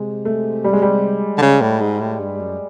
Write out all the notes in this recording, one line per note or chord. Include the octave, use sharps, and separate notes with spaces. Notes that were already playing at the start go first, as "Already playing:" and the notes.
Already playing: C3 G#3
A3
G3
G#3
G3
D3
C#3
A2
G#2
A2
G2
F#2